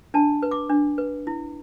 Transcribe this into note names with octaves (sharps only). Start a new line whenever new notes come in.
D4 A5
B4
D6
D4
B4
E4